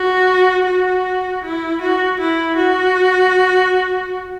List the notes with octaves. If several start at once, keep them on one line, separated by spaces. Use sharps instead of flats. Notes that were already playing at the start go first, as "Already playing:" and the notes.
Already playing: F#4
F#4
E4
F#4
E4
F#4